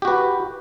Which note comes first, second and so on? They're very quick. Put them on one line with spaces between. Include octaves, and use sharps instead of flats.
G4 F#4 B4